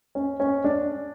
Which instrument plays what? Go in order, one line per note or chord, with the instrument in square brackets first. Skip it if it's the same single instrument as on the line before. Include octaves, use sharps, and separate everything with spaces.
[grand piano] C#4
C#4
D4